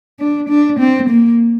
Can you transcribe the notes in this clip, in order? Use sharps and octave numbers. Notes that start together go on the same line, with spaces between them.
D4
D4
C4
A#3